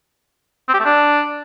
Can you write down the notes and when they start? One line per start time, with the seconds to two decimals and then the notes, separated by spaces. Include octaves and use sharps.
0.68 C4
0.74 G4
0.80 A3
0.85 D4